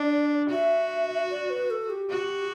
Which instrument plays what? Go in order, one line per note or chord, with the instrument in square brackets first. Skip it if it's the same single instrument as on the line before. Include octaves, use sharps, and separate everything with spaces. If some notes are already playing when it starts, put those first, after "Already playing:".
Already playing: [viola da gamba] D4 [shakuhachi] D5
[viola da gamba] F#4 [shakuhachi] E5
[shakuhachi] D5
B4
A4
G4
[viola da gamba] F#4